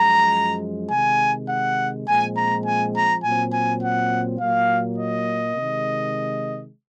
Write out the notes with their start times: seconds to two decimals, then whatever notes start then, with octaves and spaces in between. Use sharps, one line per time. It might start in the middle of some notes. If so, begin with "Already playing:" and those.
Already playing: F#2 F3 G#3 A#5
0.91 C3 D#3 G#3 G#5
1.50 F#5
2.07 A#2 F3 G#3 C4 G#5
2.37 A#5
2.65 G#5
2.95 A#5
3.24 A#2 F#3 C4 G#5
3.53 G#5
3.82 F#5
4.40 A#2 F#3 A#3 F5
4.98 D#5
5.56 C3 D#3 G#3